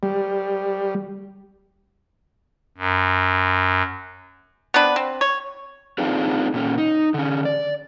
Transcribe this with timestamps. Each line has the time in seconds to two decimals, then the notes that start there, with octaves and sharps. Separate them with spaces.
0.03 G3
2.77 F#2
4.74 B3 C4 D4 B4
4.96 C4
5.21 C#5
5.98 C4 D4 D#4 F4 G#4 B4
6.54 A#2 C#4
6.78 D#4
7.14 D3 C#4
7.45 D5